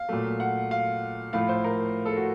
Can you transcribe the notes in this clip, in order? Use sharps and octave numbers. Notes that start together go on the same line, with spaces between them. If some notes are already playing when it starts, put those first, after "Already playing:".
Already playing: F5
A#2 F#3 A3
F#5
F5
A2 F3 A3 F5
C5
A#4
A4
F#4